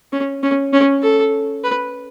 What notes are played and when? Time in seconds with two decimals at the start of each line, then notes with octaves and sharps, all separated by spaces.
0.12 C#4
0.43 C#4
0.73 C#4
1.03 A4
1.63 B4